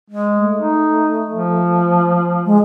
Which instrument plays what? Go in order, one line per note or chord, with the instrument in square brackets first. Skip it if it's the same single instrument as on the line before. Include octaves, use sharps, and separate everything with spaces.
[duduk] G#3
[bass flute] A3
[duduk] D#4
F3
[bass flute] G#3